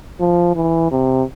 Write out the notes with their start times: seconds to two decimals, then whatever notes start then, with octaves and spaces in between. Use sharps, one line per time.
0.20 F3
0.56 E3
0.91 C3